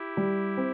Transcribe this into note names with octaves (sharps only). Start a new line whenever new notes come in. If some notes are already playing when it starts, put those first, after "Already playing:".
Already playing: E4 G4
G3
C4